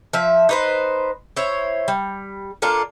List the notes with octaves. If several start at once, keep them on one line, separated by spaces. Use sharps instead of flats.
F3 E5
D#4 B4 C5
E4 C5 C#5
G3
A#3 D4 F4 A4